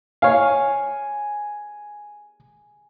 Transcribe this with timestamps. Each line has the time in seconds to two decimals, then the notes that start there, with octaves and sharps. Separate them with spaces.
0.22 C#5 F5 G#5